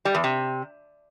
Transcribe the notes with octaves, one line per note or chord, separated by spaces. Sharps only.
G3
E2
C3